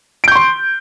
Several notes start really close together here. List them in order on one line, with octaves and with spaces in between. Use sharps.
D7 G6 C#6 C6